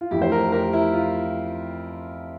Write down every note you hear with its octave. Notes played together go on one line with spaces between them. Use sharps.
F4
F2 E3 A3 E4 G4
C5
G4 A#4
G4 A#4
E4
F4